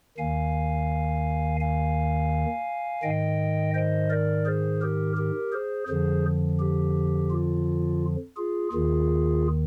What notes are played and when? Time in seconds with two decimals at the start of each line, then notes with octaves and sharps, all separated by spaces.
0.18 D#2 D#3 F5 G#5
1.60 F5 G#5
3.03 G#2 D#3 D#5 G5
3.75 C5 D#5
4.10 A#4 D5
4.46 G#4 C5
4.81 G4 A#4
5.16 G4 A#4
5.52 G#4 C5
5.88 F2 D3 F3 G#4 C5
6.59 G4
7.31 F4
8.37 F4 G#4
8.73 D#2 D#3 F4 G#4